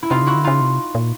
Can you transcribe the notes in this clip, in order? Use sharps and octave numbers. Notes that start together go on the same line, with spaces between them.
E4
C3 D#4 F4
C#3 E4 F#4
D3
C#3 D#4 F4
C3
A#2